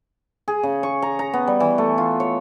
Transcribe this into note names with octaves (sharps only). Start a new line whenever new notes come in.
G#4
C#3
C#6
A#5
A#5
B3
G3
E3
A3
F4
C#5